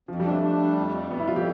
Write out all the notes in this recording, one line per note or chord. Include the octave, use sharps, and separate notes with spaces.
F2 F3
G3
D4
A3
D4
G3
F2
G3
F2 B3
E4
F2 F4
G4